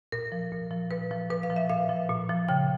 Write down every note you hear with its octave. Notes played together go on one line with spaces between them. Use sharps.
A#2 A#4
F3
A#2
F3
A#2 B4
F3
A#2 B4
F5
F3
E5
A#2 F5
F3
A#2
F3
C#3 G5